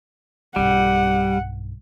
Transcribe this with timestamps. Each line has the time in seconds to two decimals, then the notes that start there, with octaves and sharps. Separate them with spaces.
0.56 B1 G2 G3 F#5